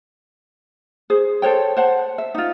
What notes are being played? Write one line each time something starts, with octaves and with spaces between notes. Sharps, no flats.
G#4 C5
A4 C5 C#5 G5
C5 F#5 A5
E5
D#4 F4